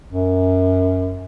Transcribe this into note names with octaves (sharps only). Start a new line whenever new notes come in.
F#2